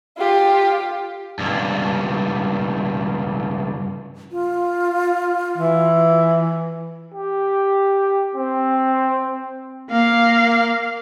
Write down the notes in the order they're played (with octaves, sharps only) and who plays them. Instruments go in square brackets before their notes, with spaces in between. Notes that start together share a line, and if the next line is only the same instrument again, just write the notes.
[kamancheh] F4 G4
[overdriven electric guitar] C#2 G2
[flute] F4
[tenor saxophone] E3
[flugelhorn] G4
C4
[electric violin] A#3 F5